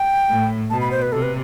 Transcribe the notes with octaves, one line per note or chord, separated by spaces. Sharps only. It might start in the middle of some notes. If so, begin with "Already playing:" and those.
Already playing: G5
A2
B2 A5
B5
C5
B4
C3 A4
B4